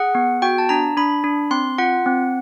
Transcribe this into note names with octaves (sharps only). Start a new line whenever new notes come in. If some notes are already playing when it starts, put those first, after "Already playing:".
Already playing: G#4 F#5
B3
F#4 G5
A5
D4 A#5
D4 B5
D4
C4 C6
F4 F#5
C4